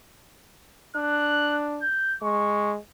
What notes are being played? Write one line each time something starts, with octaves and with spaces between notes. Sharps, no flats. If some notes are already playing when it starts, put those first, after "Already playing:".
D4 F#6
G6
G#3 C#6